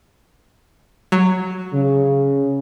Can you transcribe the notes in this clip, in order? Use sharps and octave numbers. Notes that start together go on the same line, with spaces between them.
F#3
C#3